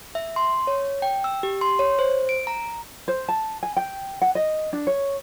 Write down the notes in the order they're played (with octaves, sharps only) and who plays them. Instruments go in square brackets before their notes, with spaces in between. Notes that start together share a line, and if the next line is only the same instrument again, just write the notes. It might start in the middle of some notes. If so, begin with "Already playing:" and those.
[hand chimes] E5
C6
C#5
G5
E6
G4
C6
C#5
C5
D7
A#5
[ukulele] C5
A5
G#5
G5
F#5
D#5
D4
C#5